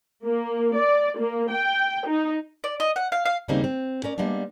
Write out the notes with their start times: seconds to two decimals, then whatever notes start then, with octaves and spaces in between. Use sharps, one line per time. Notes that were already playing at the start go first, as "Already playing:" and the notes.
0.24 A#3
0.76 D5
1.18 A#3
1.51 G5
2.07 D#4
2.64 D5
2.80 D#5
2.96 F#5
3.12 F5
3.26 F5
3.48 D#2 C#3 G3 A#3 C4 D#4
3.64 C4
4.04 C#4 A#4 D5
4.18 G3 G#3 A#3 B3 D4